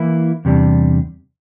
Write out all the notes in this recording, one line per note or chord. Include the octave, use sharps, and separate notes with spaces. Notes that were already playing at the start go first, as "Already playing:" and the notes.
Already playing: E3 A#3 E4
E2 C3 G3 D4